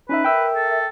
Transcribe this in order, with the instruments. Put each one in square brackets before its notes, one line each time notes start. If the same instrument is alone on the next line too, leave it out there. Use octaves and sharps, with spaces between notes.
[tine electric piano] C#4 D#4 E5 [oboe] B4
[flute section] A#4 E5 [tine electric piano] G5 E6
[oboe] A4